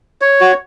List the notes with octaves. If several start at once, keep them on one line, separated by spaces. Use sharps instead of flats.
C#5
F#4